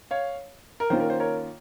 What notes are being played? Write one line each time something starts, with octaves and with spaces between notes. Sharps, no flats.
C#5 F5
A#4
D#3 A#3 C#4 F4 C5
A#4
C5
A#4 C#5